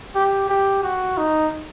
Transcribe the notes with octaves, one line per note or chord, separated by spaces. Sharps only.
G4
G4
F#4
D#4